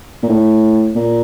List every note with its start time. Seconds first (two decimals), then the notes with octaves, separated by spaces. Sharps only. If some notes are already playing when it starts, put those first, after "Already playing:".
0.23 A#2
0.29 A2
0.95 A#2